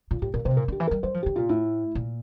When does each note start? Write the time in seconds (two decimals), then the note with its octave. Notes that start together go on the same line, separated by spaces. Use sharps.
0.11 A#2 F4
0.22 A2 G4
0.34 A#2 A#4
0.45 C3 C5
0.57 A#2 A#4
0.68 D3 G4
0.80 E3
0.87 A#4
0.91 G3
1.03 G3 C5
1.14 F3
1.23 D3 G4
1.36 A#2 F4
1.49 A2 E4
1.95 A#2